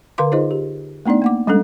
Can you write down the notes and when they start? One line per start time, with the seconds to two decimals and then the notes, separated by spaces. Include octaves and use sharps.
0.18 D3 A#4 B4 F5 C6 D6
0.32 D#4 F4 G#4 C5 D#5
0.51 G4
1.06 A3 B3 D4 D#4 D5
1.22 A#3 F#5 D6
1.47 G3 G#3 C#4 D4 A4